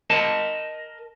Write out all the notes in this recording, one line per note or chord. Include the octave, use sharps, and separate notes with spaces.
A#4 D#5 A5